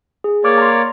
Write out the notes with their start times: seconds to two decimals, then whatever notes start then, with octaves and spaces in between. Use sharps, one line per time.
0.24 G#4
0.44 A#3 C#5 D5 C#6 D6 F6
0.58 A#5 C6